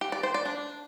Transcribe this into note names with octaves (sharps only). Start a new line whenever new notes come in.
G4
D5
C5
D5
D4